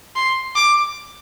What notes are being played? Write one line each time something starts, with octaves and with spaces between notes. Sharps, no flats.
C6
D6